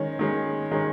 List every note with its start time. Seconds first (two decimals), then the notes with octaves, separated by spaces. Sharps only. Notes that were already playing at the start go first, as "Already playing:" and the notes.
Already playing: D#3 G#3 C#4
0.19 D#3 G#3 C#4
0.71 D#3 G#3 C#4